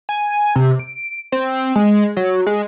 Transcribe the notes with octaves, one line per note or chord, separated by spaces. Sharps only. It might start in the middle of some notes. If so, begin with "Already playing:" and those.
G#5
C3
D7
C4
G#3
F#3
G#3